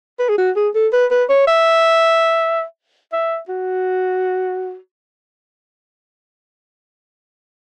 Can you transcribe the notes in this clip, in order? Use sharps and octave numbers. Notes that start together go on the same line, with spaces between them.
B4
G#4
F#4
G#4
A4
B4
B4
C#5
E5
E5
F#4